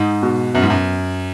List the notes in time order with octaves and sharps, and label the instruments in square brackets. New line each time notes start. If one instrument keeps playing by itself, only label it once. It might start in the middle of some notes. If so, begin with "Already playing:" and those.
Already playing: [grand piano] G#2 [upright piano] D#4
[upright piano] B2
[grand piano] F#2 [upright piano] B3
[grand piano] G#2
F#2